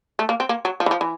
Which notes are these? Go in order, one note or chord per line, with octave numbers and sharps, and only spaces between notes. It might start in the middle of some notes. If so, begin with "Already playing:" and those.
A3
A#3
C4
A#3
F#3
F3
E3
F3
E3